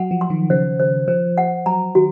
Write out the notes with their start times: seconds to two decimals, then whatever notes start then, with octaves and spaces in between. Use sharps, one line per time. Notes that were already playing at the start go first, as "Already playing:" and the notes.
Already playing: F#3 F#5
0.11 F3
0.21 C6
0.30 D#3
0.50 C#3 C5
0.80 C5
1.08 F3 C5
1.38 F#5
1.66 F#3 A#5
1.95 D#3 F#4